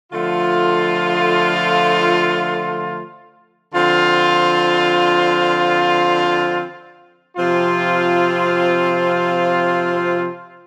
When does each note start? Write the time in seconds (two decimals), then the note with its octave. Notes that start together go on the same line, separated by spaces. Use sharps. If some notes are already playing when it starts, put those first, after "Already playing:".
0.13 D3 F3 A3 F4
3.75 D3 F3 C4 F4
7.37 C3 F3 C4 F4